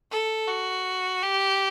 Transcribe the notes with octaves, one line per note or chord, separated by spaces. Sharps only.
A4
F#4
G4